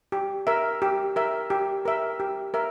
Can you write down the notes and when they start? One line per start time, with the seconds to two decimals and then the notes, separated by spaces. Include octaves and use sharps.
0.12 G4
0.47 A#4 E5
0.82 G4
1.16 A#4 E5
1.50 G4
1.85 A#4 E5
2.20 G4
2.54 A#4 E5